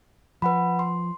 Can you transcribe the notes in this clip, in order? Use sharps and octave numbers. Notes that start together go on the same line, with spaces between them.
F3 B4 F#5 B5
C6